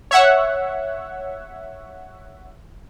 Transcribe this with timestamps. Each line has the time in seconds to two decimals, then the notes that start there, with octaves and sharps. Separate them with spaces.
0.11 C#5 E5 F#5